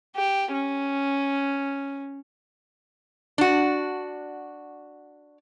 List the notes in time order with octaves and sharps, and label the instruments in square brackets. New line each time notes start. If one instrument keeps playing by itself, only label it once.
[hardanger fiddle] G4
C#4
[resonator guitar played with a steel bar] D4 F#4